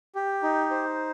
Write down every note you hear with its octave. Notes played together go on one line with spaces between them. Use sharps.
G4
D#4
C5